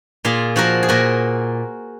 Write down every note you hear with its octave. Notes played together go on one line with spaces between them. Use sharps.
A#2 F4 G#4
F3 F#4 A#4
G#4
A#2 F#4 A#4